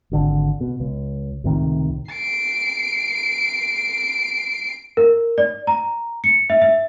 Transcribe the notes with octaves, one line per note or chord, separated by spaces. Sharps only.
G#1 D3
B2
C#2
C#2 A2 C3 D#3
C7 D7
A#4
D5
A#5
C#7
E5
E5